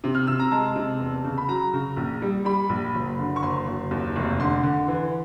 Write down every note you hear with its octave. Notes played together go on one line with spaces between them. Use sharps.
C3
F6
C3 E6
A#5
G#3 A5
C3
E2
C#3
B5
F#3 A#5
C#3
A#1
G3
G3 B5
A#1
F#1
D3
C#6
F#1 C6
F#1
D#2
F1
D3 C6
D3
E3